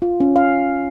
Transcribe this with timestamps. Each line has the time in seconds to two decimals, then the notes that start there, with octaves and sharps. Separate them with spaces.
0.02 F4
0.20 C#4
0.36 F5